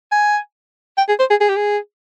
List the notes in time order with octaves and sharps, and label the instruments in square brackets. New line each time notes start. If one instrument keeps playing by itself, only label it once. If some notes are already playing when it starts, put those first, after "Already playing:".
[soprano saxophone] G#5
G5
G#4
C5
G#4
G#4
G4
G#4